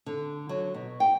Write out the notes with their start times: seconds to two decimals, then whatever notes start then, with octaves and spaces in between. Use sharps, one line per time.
0.06 D3
0.49 F#3
0.74 B2
1.00 G5